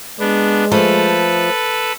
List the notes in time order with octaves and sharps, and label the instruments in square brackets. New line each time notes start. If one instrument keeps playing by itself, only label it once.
[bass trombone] G#3 [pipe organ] B3 D4
[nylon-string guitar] F3 A3 [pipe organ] A4 B4